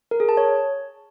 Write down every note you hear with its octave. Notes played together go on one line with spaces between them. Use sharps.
A#4
G#4
A5
C#5